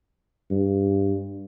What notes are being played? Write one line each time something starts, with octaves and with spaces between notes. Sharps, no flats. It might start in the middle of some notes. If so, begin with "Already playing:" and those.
G2